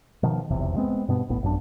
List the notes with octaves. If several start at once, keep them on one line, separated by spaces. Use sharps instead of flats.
B2 D#3 F3
F1 B1 E2 C3
G#3 B3 C4
G2 B2 B3
E1 A1 A2 B3
A1 F#2 D4